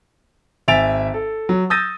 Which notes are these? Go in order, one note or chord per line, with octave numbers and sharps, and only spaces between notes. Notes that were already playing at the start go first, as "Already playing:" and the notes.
G#1 E5 G#5 A6 D7 F7
A4
F#3
D#6 E6 G6 A6 A#6 D#7